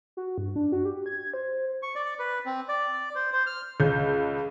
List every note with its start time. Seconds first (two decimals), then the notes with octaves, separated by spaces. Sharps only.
0.17 F#4
0.38 G2
0.56 D4
0.72 F#4
0.85 G4
1.06 G#6
1.34 C5
1.83 C#6
1.95 D5
2.19 B4
2.46 C4
2.69 D5
3.15 C5
3.33 C5
3.46 F6
3.80 C#2 G6